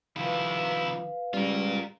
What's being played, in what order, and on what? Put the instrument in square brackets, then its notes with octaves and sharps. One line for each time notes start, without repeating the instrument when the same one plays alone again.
[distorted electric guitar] C3 E4 [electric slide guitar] D#3 F3 [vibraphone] B4 F5
[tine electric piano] G3 [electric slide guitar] G#3 C#4 [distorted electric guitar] F4 A#4